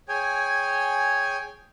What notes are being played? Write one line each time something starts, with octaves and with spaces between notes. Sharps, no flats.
G#4 C#5 G5 G#5